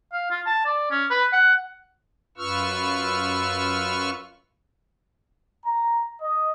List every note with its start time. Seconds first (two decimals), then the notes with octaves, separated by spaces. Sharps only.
0.12 F5
0.31 F4
0.46 A5
0.66 D5
0.91 C#4
1.10 B4
1.32 F#5
2.38 F#2 F4 B4 C#6 E6 F6
5.65 A#5
6.21 D#5